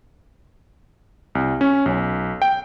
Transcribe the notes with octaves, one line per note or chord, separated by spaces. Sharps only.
C2
C#4
B1
G5